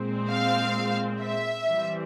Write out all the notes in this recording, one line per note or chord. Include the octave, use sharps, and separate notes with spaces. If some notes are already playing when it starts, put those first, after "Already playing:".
Already playing: A#2 G#3 C4
F5
E5
E3 G3 C4